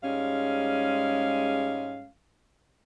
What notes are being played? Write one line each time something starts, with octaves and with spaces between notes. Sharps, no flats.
G#2 G3 G#3 C#4 F5